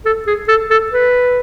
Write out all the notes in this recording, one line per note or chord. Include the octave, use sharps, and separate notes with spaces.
A4
G#4
A4
A4
B4